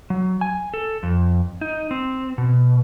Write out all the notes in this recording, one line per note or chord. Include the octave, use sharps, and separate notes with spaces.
F#3
G#5
A4
F2
D#4
C4
B2